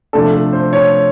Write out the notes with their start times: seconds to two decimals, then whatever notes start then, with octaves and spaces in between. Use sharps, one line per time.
0.13 C3 F3 A3 D4 A4
0.33 A4
0.53 C5
0.73 C#5